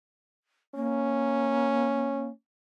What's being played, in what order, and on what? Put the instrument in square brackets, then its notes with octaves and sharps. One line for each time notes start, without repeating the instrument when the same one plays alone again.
[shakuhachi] A#3 [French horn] C#4